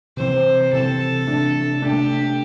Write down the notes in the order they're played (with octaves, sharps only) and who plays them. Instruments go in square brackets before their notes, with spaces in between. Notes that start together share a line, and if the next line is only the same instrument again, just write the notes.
[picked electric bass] C3 E3 C4 [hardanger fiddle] C5
[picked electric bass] C3 E3 C4 [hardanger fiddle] A4
[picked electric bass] C3 A3 D4
[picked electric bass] C3 A3 D4 [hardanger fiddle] G4